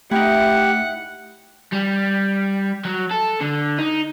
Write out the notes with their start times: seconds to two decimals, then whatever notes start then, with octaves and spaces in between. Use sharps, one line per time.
0.11 A3 D#4 E4 G4 F#5
1.72 G3
2.85 F#3
3.11 A4
3.41 D3
3.79 D#4